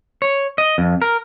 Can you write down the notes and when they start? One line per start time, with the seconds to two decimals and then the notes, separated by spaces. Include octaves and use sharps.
0.22 C#5
0.58 D#5
0.78 F2
1.02 A#4